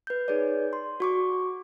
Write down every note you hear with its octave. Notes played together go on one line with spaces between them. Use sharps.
B4 G6
D#4 G#4 B4 C#5 D5
C6
F#4 C#6 D6